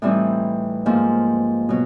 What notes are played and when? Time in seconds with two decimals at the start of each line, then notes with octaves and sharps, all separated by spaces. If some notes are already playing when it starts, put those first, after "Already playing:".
0.02 A2 E3 G3 C4 D#4
0.86 G#2 F3 A#3
1.69 B2 F#3